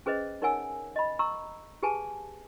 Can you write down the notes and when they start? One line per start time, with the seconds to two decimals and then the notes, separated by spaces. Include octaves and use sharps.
0.06 C#4 G#4 B4 C5 D#5
0.42 D#4 A#4 C#5 F#5 G#5 E6
0.96 D#5 B5
1.19 A#5 C#6 E6
1.83 G4 G#4 B4 G#5 A5